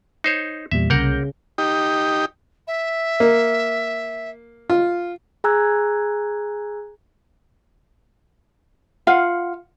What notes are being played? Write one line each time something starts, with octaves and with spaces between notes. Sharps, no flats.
D#4 C5 C#5
E2 A#2 G3 E5
C2 C#3 A#3 A#4 F#5 G6
D#4 G4
E5
A#3
F4
G#4 G#5 A#5 E6 F#6 G#6
F4 F5 F#5